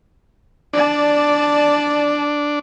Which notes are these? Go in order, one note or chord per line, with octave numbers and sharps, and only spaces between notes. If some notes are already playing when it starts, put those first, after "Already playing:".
D4 D5 A5